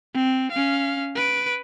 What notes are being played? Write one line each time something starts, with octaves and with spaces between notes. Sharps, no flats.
C4
C#4 F5
B4 D7